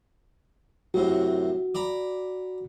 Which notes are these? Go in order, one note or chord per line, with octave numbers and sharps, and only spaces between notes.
F#2 A2 C3 F#4
D5 A#5 B5